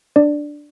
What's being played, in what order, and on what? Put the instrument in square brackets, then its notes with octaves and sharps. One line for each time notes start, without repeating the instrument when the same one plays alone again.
[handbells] D4 D5